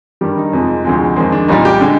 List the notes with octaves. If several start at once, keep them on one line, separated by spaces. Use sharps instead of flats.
G2 D#3 G3 G4
D#4
F2 C3 F3 G#3
D2 C3 F3 G#3
F2 D#3 G#3 C4
D4
C2 A#2 G3 D#4
G4
D3 G#3